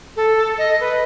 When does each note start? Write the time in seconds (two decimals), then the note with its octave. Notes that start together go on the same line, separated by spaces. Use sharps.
0.16 A4
0.58 D#5
0.80 B4